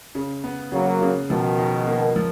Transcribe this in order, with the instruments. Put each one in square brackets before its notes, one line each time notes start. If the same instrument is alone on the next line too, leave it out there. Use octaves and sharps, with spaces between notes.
[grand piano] C#3
B3
[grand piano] C#3 [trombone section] F#3 A#3
[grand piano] C#3
[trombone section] B2 D#3 [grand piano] F3
[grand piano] D#4
A#3
F3